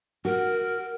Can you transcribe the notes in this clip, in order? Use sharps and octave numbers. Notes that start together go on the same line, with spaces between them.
F#4 A#4